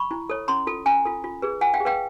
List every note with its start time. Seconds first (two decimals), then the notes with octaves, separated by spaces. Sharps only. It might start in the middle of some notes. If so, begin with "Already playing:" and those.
Already playing: B5 C#6
0.11 E4
0.29 A4 C#5
0.48 C#4 A#5 C6
0.67 F4 A4
0.86 C#4 G#5 A#5
1.05 F4 A4
1.24 F4
1.42 G#4 B4
1.61 F4 F#5 G#5
1.74 F5 G5
1.80 G#4
1.85 B4 F5 G5